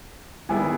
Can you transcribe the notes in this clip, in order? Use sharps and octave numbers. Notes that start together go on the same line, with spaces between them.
D#3 G3 B3 E4 G#4 G#5